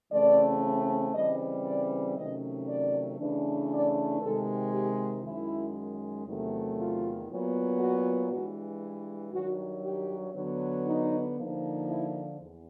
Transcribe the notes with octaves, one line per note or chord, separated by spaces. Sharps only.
C#3 E3 A3 C4 D5
C#3 E3 G3 C4 D#5
D5
C3 D#3 F#3 A3 C#4 D#5
D5
C#3 E3 A3 D4
D5
C3 D#3 G#3 A4
G4
F#2 D#3 G#3 E4
E2 C3 D#3 F#3 A3
F4
A#2 F#3 B3
F#4
G2 E3 G#3 F#4
G2 D#3 F#3 F#4
G4
D3 F#3 B3
D#4
D3 F3 A#3 D#4
E4
E2